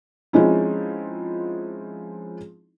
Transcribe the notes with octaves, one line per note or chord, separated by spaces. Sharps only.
F3 G#3 C4 C#4 D#4 E4